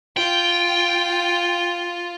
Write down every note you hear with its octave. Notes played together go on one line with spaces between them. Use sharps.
F4 G5